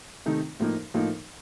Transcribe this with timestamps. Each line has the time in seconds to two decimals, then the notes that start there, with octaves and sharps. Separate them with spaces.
0.26 C3 D#3 A3 D#4
0.60 A2 F3 A#3 D#4
0.94 A2 F3 A#3 D#4